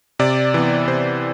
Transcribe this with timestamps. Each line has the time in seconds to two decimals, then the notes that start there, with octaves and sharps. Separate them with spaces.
0.19 C3 D5
0.54 E3 B3
0.87 C3 C5